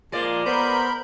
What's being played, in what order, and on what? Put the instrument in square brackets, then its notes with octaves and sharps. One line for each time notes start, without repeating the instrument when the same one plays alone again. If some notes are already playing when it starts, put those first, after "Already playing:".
[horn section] A#2 F3 A#3 [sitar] G#3 D5
[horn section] B3 C5 [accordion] A#4 B5 G6